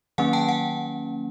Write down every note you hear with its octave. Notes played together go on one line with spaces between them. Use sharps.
D#3 F#3 A#3 C#4 F#5 G#5
G5 A5
F#5 G#5